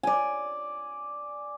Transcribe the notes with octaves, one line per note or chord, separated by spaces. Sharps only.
D5 G#5